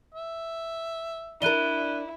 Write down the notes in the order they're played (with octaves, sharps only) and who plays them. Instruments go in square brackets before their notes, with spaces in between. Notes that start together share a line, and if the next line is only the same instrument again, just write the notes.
[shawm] E5
[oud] D4 A#4 [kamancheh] E4 [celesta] F#6 D#7 G7